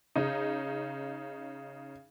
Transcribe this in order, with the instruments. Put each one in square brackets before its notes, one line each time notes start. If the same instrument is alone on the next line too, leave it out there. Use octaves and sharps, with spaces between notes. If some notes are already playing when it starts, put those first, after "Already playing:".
[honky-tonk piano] C#3 D#4